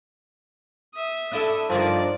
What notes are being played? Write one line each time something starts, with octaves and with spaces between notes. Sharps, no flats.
E5 D#6
D4 E4 A4
G2 D3 D#3 F3 D5